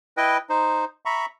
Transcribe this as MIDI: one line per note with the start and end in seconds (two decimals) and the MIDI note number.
0.17 0.38 64
0.17 0.38 71
0.17 0.38 75
0.17 0.38 79
0.49 0.85 63
0.49 0.85 72
1.05 1.26 76
1.05 1.26 82
1.05 1.26 83
1.05 1.26 85